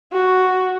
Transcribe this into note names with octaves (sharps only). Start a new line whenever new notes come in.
F#4